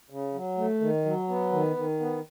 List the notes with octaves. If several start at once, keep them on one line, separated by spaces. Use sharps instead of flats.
C#3
F#3
A3
D#3
F#3
B3
D#3
D#3
B3